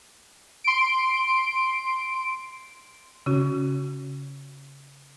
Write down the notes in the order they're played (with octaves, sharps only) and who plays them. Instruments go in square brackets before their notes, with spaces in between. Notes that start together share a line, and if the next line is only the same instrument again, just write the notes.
[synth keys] C6 D7
[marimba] C#3 C#4 F#4